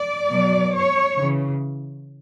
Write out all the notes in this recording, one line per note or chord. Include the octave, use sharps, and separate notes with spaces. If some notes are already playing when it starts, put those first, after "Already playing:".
Already playing: D5
B2 F#3
C#5
C#3 E3